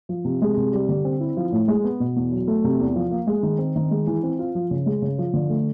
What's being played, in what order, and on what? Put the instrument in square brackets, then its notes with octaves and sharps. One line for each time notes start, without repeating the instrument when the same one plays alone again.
[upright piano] F3
C3
G#3
C3
G3
D3
C4
E4
F3
A2
G#3
B3
B2
E2
F#3
A3
C3
E2
F3
A#3
G#3
D#3
C4
D#3
G#3
E3
C4
F4
F3
C#3
G#3
C#3
F3
D3
A3